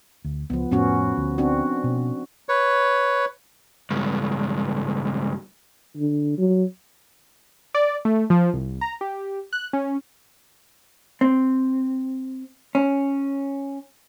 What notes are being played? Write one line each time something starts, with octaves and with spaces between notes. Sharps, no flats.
D2
C#2 F3 B3
F2 A2 B3 C#4 F#4
D2
C4 D4 F#4
B2
B4 C#5
C#2 G2
D3
F#3
D5
A3
F3
C2
A#5
G4
F#6
C#4
C4
C#4